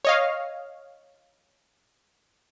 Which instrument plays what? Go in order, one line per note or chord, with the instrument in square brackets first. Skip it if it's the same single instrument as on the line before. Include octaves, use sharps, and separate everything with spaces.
[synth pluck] C#5 D#5 F5